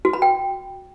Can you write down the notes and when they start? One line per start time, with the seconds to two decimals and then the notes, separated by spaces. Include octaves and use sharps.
0.05 F#4
0.13 B5
0.22 G5